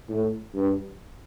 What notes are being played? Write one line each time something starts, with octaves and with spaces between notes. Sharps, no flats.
A2
G2